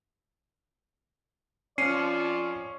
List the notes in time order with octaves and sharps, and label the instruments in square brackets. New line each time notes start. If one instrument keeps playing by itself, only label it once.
[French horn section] F2 F3 [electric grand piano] C#4 C#7 D#7 [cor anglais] D5 [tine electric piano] F6 C7